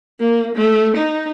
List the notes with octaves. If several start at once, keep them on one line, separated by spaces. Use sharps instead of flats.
A#3
A3
D#4